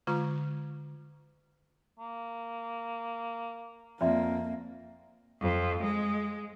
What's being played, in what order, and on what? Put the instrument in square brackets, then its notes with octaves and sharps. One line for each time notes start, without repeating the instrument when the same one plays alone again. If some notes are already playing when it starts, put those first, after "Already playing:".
[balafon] D3 G#3 F4 A#5
[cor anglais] A#3
[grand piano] F2 [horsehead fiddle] A#3 [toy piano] D5 E5 C6
[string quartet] F2
G#3